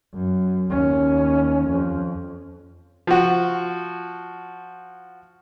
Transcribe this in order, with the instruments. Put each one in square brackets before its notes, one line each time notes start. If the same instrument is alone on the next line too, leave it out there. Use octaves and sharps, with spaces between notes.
[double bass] F#2
D#2 C#4
F2
[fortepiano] F3 F#4